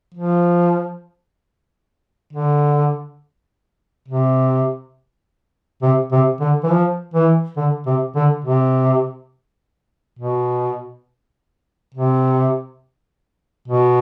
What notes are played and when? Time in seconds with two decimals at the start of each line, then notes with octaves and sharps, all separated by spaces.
0.14 F3
2.33 D3
4.08 C3
5.82 C3
6.12 C3
6.40 D3
6.63 E3
6.70 F3
7.14 E3
7.57 D3
7.86 C3
8.15 D3
8.44 C3
10.19 B2
11.94 C3
13.68 B2